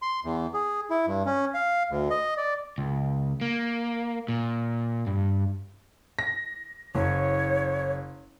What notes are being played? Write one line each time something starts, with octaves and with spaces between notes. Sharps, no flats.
C6
E2
G#4
E4
G2
C#4
F5
D2
D#5
D5
C#2
A#3
A#2
G2
A#6
F#1 C#5